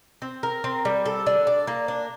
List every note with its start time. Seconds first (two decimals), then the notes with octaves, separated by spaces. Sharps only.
0.22 C4
0.43 A#4
0.64 C4
0.85 G3
1.06 A4
1.27 D4
1.47 D5
1.67 A#3
1.88 D4